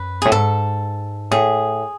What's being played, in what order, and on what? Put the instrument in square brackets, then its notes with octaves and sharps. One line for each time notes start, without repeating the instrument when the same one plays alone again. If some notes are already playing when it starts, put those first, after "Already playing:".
Already playing: [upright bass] F#2 [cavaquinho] B4
[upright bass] A2 [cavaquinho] G#4
[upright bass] G#2 [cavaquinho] A4
[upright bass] A2 [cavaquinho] G#4